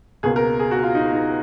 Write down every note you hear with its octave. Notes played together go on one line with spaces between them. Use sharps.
C#2 B2 A#3 G#4
A#4
G#4
F#4
F4
D#4
D#4